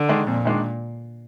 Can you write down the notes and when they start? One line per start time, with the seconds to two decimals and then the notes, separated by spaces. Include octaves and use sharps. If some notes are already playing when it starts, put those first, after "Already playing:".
Already playing: D3
0.09 D#3 G#3 D4
0.27 F2 A#2
0.45 D#3 G#3 D4